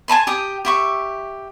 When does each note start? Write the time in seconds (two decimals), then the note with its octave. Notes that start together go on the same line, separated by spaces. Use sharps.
0.08 G#5 A5 B5 C6
0.27 G4 G5 D#6
0.65 G4 E5 C#6